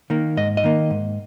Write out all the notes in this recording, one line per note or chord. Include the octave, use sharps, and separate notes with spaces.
D#3 A#3
G#2 D#5
D#5
D#3 A#3
G#2